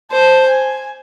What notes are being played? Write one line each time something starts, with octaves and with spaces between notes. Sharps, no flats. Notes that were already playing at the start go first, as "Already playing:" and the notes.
C5 A5
G#5